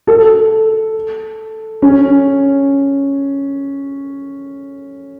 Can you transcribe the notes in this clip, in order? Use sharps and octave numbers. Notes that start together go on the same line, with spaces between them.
A4
C#4